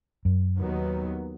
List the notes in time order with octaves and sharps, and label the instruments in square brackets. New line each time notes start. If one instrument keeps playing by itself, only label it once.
[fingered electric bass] F#2
[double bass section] D#2 D#3 F#3 B3